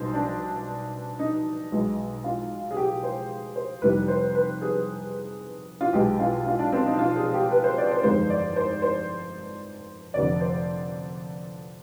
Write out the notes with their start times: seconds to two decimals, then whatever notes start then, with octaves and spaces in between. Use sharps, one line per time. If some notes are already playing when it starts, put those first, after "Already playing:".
Already playing: B1 B2 G3 D#4 C5
0.14 D4
1.19 D#4
1.72 B1 B2 G#3
2.24 F4
2.71 G#4
2.77 G4
3.03 C5
3.56 C5
3.82 F1 F2 D#3 G3 B4
4.08 C5
4.35 B4
4.61 G#4
5.81 F4
5.93 B1 B2 G#3 G4
6.19 F4
6.46 F4
6.59 D4
6.72 C4
6.85 D#4
6.99 F4
7.16 G#4
7.34 G4
7.51 B4
7.64 C5
7.78 D5
7.91 C5
8.03 G1 F2 D#3 G#3 C5
8.30 D5
8.56 C5
8.82 C5
10.14 F1 F2 D3 D5
10.40 C5